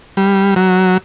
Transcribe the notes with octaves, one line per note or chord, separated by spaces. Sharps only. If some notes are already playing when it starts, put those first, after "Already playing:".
G3
F#3